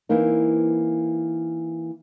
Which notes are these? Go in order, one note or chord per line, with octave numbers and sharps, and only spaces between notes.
E3 A#3 C4 D#4